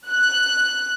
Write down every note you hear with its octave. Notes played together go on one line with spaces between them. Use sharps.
F#6